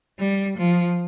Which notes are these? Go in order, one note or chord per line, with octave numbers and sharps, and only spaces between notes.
G3
F3